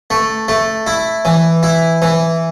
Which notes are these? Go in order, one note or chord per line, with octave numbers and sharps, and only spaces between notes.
A3
A3
E4
E3
E4
E3